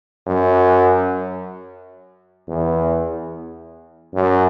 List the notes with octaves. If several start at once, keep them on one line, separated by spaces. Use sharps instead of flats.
F#2
E2
F#2